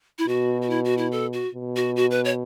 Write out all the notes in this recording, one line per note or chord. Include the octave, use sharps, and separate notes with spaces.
E4
B2 F#4
F#4
E4
F#4
E4
A4
F#4
B2
F#4
F#4
B4
C#5